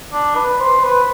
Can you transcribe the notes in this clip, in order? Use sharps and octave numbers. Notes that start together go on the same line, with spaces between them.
D4
B4
C5
B4